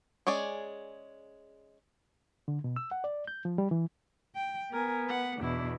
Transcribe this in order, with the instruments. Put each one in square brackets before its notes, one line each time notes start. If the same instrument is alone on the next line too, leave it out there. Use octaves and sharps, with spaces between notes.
[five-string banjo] G#3 C#4 G#4 D5
[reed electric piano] D3
B2
E6
F#5
D5
G6
F3
G3
E3
[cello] G5
[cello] B3 [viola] A#4 G#5
[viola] B4 F#5
[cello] E2 B2 [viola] D4 E4